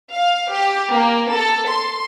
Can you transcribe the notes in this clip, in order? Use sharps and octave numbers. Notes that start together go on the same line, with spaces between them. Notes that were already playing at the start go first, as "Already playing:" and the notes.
F5
G4
A#3
A4
C6